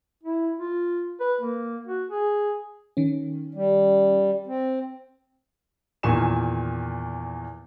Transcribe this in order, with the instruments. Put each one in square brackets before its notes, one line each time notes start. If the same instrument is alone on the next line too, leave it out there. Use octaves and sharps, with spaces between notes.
[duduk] E4
F4
B4
A#3
F#4
G#4
[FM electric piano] D#3 C#4
[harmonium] G3
C4
[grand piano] E2 A#2 D#3 G#5 C#6 E7